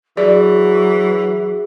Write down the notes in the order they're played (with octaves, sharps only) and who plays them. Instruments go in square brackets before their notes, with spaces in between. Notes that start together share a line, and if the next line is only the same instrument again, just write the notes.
[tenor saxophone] E3 [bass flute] F#3 [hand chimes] G#4 [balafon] D5